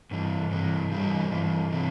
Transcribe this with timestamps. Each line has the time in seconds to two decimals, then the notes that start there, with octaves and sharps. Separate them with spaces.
0.11 G2 E3
0.51 G2 E3
0.91 G2 E3 G3
1.31 G2 E3
1.72 C3 E3